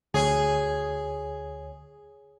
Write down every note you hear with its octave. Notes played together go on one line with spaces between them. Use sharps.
D2 G#4 C#5 G#5